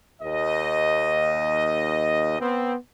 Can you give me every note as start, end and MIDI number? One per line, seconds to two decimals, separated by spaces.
0.22 2.36 39
0.22 2.36 75
2.39 2.74 59
2.39 2.74 60